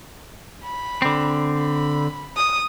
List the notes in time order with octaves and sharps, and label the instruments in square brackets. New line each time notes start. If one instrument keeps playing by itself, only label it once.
[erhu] B5
[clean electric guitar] D3 C4
[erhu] B5
D#6